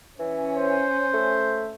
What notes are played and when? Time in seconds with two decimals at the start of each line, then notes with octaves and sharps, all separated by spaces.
0.19 E3 C#4
0.54 C5
1.14 A3